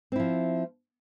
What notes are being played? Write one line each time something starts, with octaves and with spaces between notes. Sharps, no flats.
F3 C4 E4